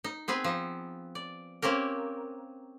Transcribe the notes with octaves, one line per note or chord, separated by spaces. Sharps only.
D#4
B3 C4 G#4 B4
F3 D#4
D5
A#3 C4 C#4 G4 A#4